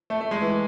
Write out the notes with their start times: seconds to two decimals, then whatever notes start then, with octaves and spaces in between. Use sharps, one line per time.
0.10 A3
0.21 A3
0.31 G#3
0.41 E3